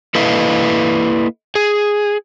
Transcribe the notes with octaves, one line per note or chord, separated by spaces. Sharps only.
A#3 E4 A4 B4 D#5 F5
G#4